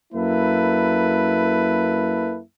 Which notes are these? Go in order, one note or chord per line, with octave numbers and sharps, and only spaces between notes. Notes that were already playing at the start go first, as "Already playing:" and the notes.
F#2 A#3 E4 A4 B4